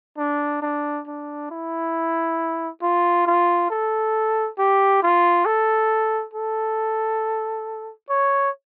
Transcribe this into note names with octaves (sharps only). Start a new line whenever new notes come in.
D4
D4
D4
E4
F4
F4
A4
G4
F4
A4
A4
C#5